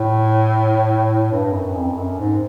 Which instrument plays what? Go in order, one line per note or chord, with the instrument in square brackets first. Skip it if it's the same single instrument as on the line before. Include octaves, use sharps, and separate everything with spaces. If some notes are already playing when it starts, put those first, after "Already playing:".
Already playing: [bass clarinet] A2
G2
F#2
F2
F#2
G#2